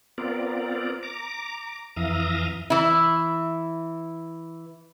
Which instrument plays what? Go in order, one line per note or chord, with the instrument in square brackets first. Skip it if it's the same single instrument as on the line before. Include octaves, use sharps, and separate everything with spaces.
[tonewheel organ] B3 C4 F4 A#4 D5
A#5 D6
F2 E3 E5 F5 A#5 D#6
[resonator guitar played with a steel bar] E3 E4